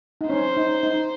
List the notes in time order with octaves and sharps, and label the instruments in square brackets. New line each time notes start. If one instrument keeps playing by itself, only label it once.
[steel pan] D#4
[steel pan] C#4 [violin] C5
[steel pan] D#4
D#4